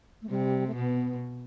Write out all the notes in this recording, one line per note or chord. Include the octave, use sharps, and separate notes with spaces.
A3
C3 G3
A3
B2 B3